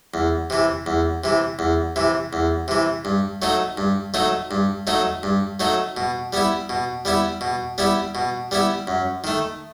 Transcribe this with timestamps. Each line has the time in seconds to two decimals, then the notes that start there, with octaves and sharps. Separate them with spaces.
0.14 E2
0.50 C3 E3
0.86 E2
1.24 C3 E3
1.59 E2
1.96 C3 E3
2.33 E2
2.68 C3 E3
3.05 G2
3.42 F#3 A3 D#4
3.77 G2
4.14 F#3 A3 D#4
4.51 G2
4.87 F#3 A3 D#4
5.23 G2
5.60 F#3 A3 D#4
5.97 B2
6.33 G3 B3 E4
6.69 B2
7.05 G3 B3 E4
7.41 B2
7.78 G3 B3 E4
8.15 B2
8.51 G3 B3 E4
8.87 F#2
9.24 D#3 A3